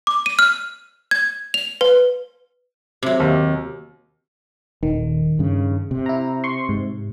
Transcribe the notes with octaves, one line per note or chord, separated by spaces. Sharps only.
D6
D#7
F6
G#6
F7
B4
C3 F#3
D#2
D#1 D#3
G2 C#3
C3
E4 A#5
C6 C#6
G#2